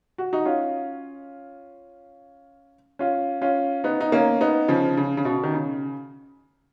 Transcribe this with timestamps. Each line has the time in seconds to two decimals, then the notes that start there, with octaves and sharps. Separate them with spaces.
0.18 F#4
0.33 D#4 F#4
0.45 C#4 F4
2.99 C#4 F4
3.42 C#4 F4
3.84 B3 D#4
4.00 D#4
4.12 A#3 C#4
4.41 B3 D#4
4.68 C#3 F3
4.97 C#3
5.17 C#3
5.25 B2
5.43 D#3
5.54 C#3